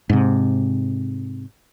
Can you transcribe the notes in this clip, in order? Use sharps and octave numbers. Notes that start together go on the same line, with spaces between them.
G#2 C3